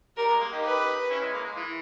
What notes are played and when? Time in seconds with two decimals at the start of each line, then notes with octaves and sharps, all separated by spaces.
0.17 G3 A#4
0.29 G#3
0.40 A#3
0.52 D#4 G4
0.64 B4
1.10 C#4 E4
1.22 G#3
1.33 A#3
1.44 G#3
1.56 E3